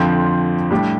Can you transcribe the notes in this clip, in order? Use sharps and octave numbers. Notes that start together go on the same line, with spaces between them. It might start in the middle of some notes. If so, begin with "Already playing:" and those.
Already playing: F2 D3 F3 C4
A2 G3 D4 G4